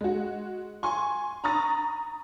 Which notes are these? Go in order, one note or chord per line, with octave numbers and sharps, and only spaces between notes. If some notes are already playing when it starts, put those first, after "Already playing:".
G#3 F#4
G#5 C6 C#6
A#5 B5 C#6 D#6 A6 A#6